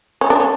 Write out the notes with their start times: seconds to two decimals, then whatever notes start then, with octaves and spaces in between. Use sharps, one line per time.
0.21 C#4
0.30 D4
0.40 C#4